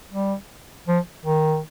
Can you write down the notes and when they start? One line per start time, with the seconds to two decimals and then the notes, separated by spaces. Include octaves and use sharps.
0.11 G3
0.87 F3
1.25 D#3